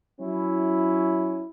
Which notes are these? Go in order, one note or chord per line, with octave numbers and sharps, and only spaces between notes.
F#3 C#4 E4